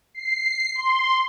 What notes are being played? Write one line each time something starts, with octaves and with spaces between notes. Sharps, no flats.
C7
C6